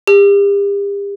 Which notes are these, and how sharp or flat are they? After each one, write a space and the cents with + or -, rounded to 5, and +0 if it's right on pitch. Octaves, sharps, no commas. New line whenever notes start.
G4 +40 E6 +35